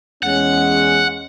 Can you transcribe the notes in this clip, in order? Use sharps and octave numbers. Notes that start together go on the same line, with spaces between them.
E2 G#3 C#4 F#5